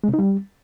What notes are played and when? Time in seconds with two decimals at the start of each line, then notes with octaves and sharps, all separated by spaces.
0.04 G#3
0.09 C3
0.14 D#4
0.19 G3